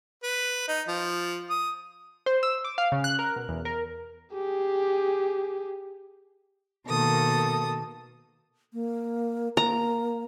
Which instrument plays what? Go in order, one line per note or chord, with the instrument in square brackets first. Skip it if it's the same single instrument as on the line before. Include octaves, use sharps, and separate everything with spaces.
[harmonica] B4
D#4
F3
D#6
[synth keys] C5
E6
D6
F5
C#3
F#6
A#4
B2
E2
A#4
[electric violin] G4 G#4
[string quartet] B2 D#3 A#3 A4 D#6
[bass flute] A#3
[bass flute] A#3 [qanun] A#5